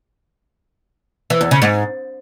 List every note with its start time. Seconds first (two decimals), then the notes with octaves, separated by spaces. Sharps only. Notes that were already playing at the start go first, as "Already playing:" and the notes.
1.30 E3
1.41 E2
1.51 C#3
1.62 G#2